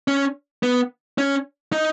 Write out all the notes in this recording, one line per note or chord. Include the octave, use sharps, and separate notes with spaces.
C#4
B3
C#4
D#4